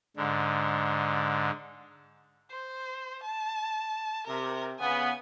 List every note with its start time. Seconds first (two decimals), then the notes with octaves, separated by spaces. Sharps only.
0.17 G#2 D3
2.51 C5
3.23 A5
4.27 C3 A#4
4.79 C#3 B3 G#5